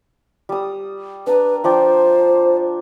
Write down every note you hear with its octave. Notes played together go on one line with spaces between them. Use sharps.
G3 D#6
D4 B4 A#5
F3 D4 C5 G5